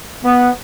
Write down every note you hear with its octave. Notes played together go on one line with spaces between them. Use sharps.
B3